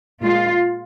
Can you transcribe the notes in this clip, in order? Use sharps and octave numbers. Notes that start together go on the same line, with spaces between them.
A#2 G#3 F4